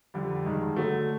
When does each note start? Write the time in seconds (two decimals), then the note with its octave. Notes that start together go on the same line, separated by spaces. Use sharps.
0.14 F2 D3 G3
0.45 G2 D#3 G#3
0.76 D3 F#3 A3